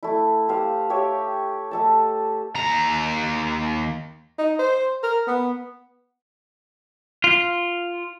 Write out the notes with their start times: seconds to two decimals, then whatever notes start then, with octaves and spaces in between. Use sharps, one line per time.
0.03 A3 E4
0.49 G4 C5 F5
0.90 G4 C#5 E5
1.71 A3 A4 A5
2.55 D#2 A#5
4.38 D#4
4.59 C5
5.03 A#4
5.27 B3
7.24 F4